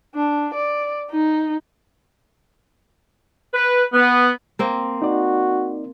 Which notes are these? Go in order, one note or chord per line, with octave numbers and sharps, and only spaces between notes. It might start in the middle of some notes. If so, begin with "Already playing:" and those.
D4
D5
D#4
B4
B3
A#3 C4
D#4 F#4 D5